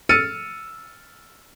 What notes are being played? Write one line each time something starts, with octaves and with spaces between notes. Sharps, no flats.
E6 F6 A6 C#7 D#7